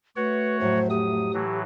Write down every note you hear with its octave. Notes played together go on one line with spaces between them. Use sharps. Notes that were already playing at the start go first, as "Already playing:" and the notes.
A3 F#4 B4 C#5 F#5
F2 A2 F#3 C5
G4 D#6
A2 E3 F#3